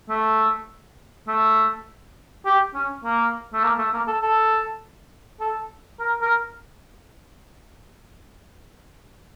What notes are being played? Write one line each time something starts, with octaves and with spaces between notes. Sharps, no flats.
A3
A3
G4
C#4
A#3
A3
A#3
A3
A#3
A4
A4
A4
A#4
A#4